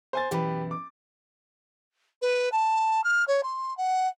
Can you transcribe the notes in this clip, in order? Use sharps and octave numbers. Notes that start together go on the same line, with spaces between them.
C5 G#5 A6
F#2 B2 E3 G4 B4
D6
B4
A5
F6
C#5
C6
F#5